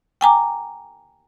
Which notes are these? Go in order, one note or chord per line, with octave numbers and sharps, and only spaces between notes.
G5 G#5 A#5 D6